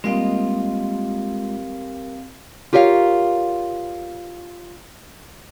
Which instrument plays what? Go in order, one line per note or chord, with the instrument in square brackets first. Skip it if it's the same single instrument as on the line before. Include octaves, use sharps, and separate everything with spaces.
[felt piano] G3 A#3 D7 [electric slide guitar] G#3 F4 D#5 [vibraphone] C4 F5
[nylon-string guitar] F4 G4 A#4 C#5 D#5 F5